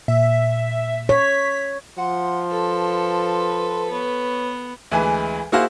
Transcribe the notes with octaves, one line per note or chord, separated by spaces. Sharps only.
A#2 E5
C#5 B6
F3 F#5 C6
A4 B4
B3 C#5
D2 E3 G#3 B4 G#5
A#3 E4 F#4 G#4 C5 F5